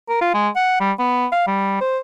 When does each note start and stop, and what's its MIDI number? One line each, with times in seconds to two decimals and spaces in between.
0.09 0.17 70
0.21 0.30 65
0.34 0.48 56
0.56 0.78 78
0.80 0.92 55
0.99 1.26 59
1.32 1.46 77
1.47 1.79 55
1.81 1.98 72